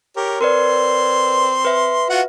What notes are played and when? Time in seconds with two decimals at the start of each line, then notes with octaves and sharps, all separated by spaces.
0.16 G4 A#4 C#5
0.41 C4 A#4 B4 D5 C6
1.65 B4 E5
2.10 F4 F#4 F#5